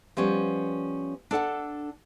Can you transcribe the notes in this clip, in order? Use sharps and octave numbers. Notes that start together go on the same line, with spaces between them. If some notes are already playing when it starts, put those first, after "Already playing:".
F3 G3 B3 C#4
D4 A4 F#5 A5